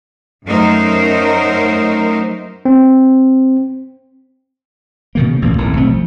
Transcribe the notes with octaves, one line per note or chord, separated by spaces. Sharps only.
F#2 F#3 A3 D#4 A#4 C5
C4
B2 D#3 A#3
C#3
A1 D#2 B2 A#3
G#1 A2 D#3
B1 A3 C4
F3